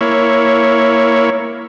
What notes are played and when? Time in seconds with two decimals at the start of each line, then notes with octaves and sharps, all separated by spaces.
0.01 A#3 E4 C#5